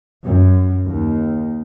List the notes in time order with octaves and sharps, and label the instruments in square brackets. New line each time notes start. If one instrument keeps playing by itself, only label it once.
[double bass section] F#2
D#2